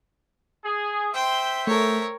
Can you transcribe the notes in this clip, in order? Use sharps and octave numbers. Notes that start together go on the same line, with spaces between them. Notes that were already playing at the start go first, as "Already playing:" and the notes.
G#4
C5 E5 G5 C6
A3 A4 A#4 C#5